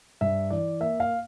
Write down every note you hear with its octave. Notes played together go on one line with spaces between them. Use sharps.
G2 E5
E3 D5
A#3 E5
F5